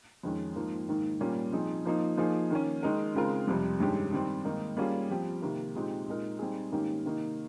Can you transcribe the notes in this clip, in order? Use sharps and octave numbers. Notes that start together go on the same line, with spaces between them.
F2 D#3 G#3 C#4
G#2 F3 A#3
G#2 D#3 A#3
A#2 G3 A#3 C#4 G4
F3 C4 D#4 G#4
F3 A#3 D#4
F3 A#3 D#4 G#4
D#3 A#3 C#4
D#3 G#3 D#4 A#4
C#3 G#3 C4 F4 A#4
F2 C3 G3
G2 D#3 G#3 C#4 G4
D#3 G3 C4
G#2 D#3 A#3 D#4
G3 A#3 C#4 F4 G#4
F3 C4 G4
C3 D#3 A#3
A#2 G#3 C4 D#4 G4
A#2 G#3 D#4 A#4
G3 C4 D#4 G#4
G#2 D#3 A#3 C#4 G4
C3 D#3 A#3 D#4